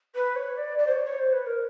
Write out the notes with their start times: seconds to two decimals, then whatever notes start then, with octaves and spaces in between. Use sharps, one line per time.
0.14 B4
0.35 C#5
0.56 D5
0.78 D5
0.86 C5
0.92 C#5
1.05 C#5
1.18 C5
1.32 B4
1.46 A#4